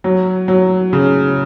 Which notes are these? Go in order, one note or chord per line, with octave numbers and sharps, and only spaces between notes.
F#3
F#3
C#3